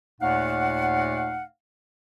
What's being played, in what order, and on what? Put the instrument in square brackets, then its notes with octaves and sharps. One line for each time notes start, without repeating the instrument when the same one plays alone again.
[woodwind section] D#2 A#2 A3 D#4 F5 F#5